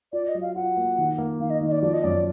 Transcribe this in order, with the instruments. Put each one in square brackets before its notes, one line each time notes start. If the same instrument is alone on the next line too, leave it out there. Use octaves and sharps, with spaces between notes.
[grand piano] F4 [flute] D5
[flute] D#5
[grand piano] F#3
[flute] F5
[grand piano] F4 [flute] F#5
[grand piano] A#3
D#3
A#3
[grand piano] D#3 [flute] F5
[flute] D#5
[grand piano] D#3
[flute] D#5
D5
[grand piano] F3 [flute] D5
[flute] D#5
[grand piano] F#2 [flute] D5